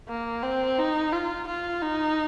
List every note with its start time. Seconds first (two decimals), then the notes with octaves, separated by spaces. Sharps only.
0.09 A#3
0.43 C4
0.79 D#4
1.13 F4
1.48 F4
1.82 D#4